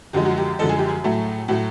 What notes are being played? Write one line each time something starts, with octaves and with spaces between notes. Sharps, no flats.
F#2 D3 F3 G#3 G4
F#4
G4
F#2 D3 F3 G#3 A4
G#4
G4
G#4
A2 F#3 A3
A2 F#3 A3 F#4